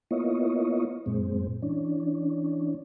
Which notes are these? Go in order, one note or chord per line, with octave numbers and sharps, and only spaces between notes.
A#3 B3 E4 F4 C#5 D#5
F#2 A#2 G#3 C4
E3 C#4 D4